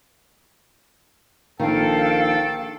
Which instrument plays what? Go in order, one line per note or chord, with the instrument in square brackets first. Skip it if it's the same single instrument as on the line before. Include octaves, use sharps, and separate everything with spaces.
[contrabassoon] A#1 [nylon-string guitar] D#3 C4 [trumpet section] A4 [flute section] F5 G5